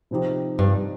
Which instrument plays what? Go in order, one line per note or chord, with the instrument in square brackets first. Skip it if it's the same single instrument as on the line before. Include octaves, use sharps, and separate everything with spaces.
[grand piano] C3 F3 C4 D#4 G4
[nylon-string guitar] G2